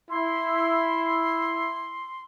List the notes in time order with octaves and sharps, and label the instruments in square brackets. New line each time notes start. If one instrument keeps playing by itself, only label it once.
[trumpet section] E4 [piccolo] C6